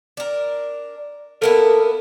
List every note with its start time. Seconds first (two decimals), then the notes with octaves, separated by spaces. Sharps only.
0.17 D4 A#4
1.42 A#3 B3 E4 A4 A#4